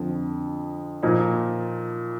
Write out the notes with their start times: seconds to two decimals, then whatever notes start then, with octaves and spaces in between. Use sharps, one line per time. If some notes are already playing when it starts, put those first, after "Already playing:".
Already playing: F2 D3 F3
1.03 A#2 F3 A#3 D#4